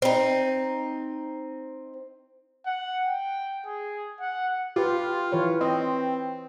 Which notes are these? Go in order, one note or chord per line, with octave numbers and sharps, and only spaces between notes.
C4 D#4
F#5
G5
G#4
F#5
F4 G4 B4
E3 B4 C#5
C4 D#5